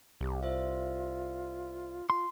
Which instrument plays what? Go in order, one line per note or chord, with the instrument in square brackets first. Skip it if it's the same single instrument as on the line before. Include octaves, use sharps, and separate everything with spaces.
[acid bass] C2 [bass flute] G4
[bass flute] F4 [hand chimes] C5 E5 F5
[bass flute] F4 [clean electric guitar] C6